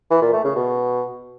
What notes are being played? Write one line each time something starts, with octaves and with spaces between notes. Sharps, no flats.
E3
A#2
A3
C#3
B2